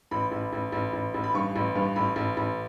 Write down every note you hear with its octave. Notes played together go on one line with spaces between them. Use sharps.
A1 B5
A1
A1
A1
A1
A1
B5
G2 C#6
A1
G2
A1 B5
A1
A1